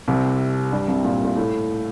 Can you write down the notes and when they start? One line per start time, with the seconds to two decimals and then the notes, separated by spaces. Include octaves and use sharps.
0.08 C2 C3
0.72 G2 G3
0.88 C2 C3
1.04 A#2
1.25 A#2
1.36 A2